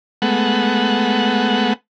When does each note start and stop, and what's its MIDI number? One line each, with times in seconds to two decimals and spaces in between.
0.22 1.73 56
0.22 1.73 57
0.22 1.73 59
0.22 1.73 78